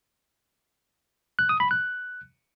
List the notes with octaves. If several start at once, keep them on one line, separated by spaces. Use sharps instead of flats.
F#6
D#6
B5
F#6